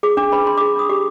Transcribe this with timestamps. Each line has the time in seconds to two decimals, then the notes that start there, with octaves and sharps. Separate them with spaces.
0.03 G#4 D6
0.17 D4 D6
0.32 B4 B5
0.47 D4 C6
0.57 G#4 D6
0.76 D4 D#6
0.89 G4 D6